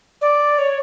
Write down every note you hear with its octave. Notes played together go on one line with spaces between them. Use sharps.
D5
C#5